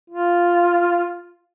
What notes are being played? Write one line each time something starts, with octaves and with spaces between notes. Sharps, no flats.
F4